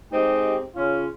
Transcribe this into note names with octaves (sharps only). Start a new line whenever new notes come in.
G#3 C4 D#4 G4
C#3 C#4 F4